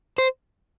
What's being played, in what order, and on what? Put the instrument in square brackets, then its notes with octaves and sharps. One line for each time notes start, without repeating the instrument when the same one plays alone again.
[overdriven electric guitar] C5